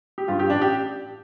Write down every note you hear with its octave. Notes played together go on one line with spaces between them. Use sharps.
G4
G2 F4
G4
A1 D4
G4